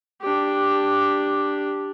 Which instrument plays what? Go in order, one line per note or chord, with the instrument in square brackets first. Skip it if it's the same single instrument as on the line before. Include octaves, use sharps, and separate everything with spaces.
[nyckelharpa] D4 G4